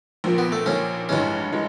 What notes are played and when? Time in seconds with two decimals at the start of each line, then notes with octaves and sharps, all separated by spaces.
0.24 A#1 A#2 F3
0.38 B3
0.52 A3
0.66 A#1 A#2 F3 C#4
1.09 A1 G2 E3 G#3 C#4
1.52 E3 G#3